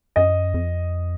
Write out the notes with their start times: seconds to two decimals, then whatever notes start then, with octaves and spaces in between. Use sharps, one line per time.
0.16 F#2 D#5
0.54 F2